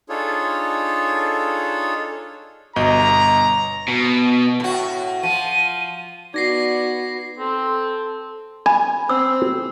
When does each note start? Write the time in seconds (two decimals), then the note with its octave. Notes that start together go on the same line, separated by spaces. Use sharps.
0.09 D4 D#4 F4 G#4 A4 C#5
2.76 G1 B2 D#5 A#5
3.88 B2
4.60 A2 F#4
5.23 F3 D#7
6.34 B3 D#4 F#4 D5 G#6 A#6 C7
7.39 C4 A4
8.66 G#5 B5
9.09 C4 E6